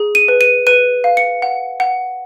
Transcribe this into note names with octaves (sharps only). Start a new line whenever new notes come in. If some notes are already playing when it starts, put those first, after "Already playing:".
Already playing: G#4
D#7
B4
D#7
B4 D#7
F5
C#7
F#5
F#5